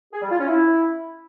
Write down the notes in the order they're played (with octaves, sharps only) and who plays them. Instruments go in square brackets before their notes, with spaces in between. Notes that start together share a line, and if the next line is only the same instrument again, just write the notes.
[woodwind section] G#4
G3
F4
C#4
E4